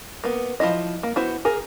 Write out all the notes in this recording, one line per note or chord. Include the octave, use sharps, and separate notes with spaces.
A#3 B3
F3 D4 E4 D#5
A#3
B3 E4 F#4 C5
G#4 A#4